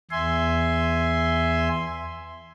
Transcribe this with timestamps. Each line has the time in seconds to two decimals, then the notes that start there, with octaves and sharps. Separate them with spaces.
0.11 E2 E5 G#5 C6